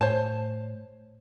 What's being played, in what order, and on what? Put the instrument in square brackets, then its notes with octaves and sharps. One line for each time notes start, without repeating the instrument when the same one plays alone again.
[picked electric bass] A2 [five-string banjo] C5 C#5 A5